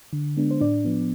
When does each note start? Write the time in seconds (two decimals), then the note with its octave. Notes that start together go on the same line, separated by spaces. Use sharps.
0.13 D3
0.37 G#3 B3 D4
0.51 C5
0.61 A2 D4 D5
0.85 F3 B3